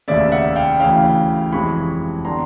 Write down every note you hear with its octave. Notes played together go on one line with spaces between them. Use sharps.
F1 D#2 C#3 D5 E5
E5 F#5
F5 G5
D2 C#3 E3 F5 G5
F#1 F2 C3 E3 G#3 B5 C#6
D3 G3 B3 A#5 C6